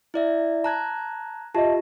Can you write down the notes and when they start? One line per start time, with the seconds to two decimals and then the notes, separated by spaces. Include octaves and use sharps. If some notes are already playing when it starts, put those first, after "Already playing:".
0.14 E4 D5 E5
0.64 A5 A#5 F#6 G#6
1.55 F4 G4 D#5 E5 A5